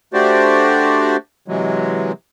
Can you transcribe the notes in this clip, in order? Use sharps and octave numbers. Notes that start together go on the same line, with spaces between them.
A3 D4 F#4 G4 C5 D5
C3 E3 F#3 G#3